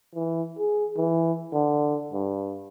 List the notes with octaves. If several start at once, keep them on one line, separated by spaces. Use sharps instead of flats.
E3
G#4
E3
D3
G2